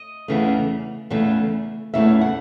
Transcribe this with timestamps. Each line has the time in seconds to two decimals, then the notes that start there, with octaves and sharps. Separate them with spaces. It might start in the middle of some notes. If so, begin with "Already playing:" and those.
Already playing: D#5
0.28 E2 C#3 E3 A3
1.10 E2 C#3 E3 A3
1.94 E2 C#3 E3 A3 E5
2.21 F#5